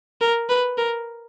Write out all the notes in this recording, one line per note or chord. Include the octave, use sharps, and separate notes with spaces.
A#4
B4
A#4